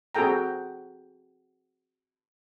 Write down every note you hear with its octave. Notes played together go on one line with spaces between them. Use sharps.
C4 F#4 G#4 A4 G5 A#5